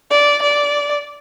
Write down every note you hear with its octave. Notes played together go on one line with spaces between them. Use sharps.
D5
D5